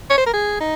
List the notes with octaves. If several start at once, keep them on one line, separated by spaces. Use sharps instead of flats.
C#5
C5
A#4
G#4
D#4